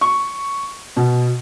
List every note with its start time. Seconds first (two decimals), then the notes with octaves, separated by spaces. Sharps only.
0.01 C#6
0.96 B2